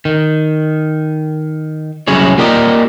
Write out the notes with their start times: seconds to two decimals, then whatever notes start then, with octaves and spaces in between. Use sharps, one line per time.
0.05 D#3
2.07 C2 F#3 C#4 E4 G#4 C#5
2.38 A#3 F4 G4 A#4 D5 D#5